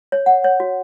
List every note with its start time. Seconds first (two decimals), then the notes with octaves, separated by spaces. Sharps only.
0.12 C#5
0.26 F#5
0.44 C#5
0.60 F#4